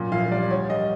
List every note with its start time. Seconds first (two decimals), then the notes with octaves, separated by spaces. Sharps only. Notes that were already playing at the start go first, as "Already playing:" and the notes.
Already playing: F#2 A#2
0.12 A#1 F5
0.31 G3 D5
0.50 D2 C#5
0.70 G3 D#5